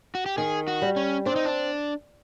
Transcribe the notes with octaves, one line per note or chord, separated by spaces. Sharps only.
F#4
G4
D#3 G#4
F#4
G3
C#4
C4 D4
D#4
D4